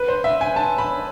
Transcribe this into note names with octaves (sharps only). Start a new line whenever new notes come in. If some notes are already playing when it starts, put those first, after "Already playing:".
Already playing: B4
C5
E5
G#5
A5
B5